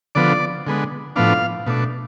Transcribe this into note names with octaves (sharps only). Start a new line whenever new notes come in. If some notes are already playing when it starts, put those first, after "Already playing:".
D3 F3 B3 D5
D3 G#3 B3
A2 F3 B3 D4 F5
B2 A3 D4